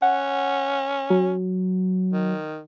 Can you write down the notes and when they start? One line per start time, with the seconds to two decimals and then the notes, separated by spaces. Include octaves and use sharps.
0.02 C#4 F#5
1.10 F#3
2.13 D#3